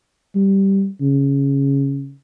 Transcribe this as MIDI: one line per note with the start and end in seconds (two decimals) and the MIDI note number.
0.35 0.88 55
1.01 2.13 49